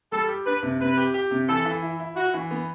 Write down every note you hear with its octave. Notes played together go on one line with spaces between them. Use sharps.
G3 A4
G4
D4 B4
C3
C3 B4
G4
G4
C3
E3 A4
E3
E4
E4
E4 F#4
E3
B3